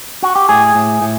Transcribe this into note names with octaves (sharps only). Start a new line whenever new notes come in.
F#4
G4
A2 G#4
A2
A2